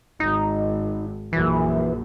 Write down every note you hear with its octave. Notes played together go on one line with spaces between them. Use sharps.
G#1 D#4
A#1 F#2 E3